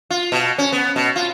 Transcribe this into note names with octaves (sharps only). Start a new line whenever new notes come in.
F4
B2
C#4
B3
B2
F4